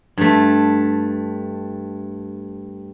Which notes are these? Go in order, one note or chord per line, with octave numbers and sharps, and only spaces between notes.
G2 A3